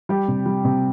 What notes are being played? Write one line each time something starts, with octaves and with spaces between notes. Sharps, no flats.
G3 G4
C3
G3
C3